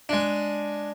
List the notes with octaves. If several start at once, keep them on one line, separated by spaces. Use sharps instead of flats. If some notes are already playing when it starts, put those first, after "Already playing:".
G#3 D4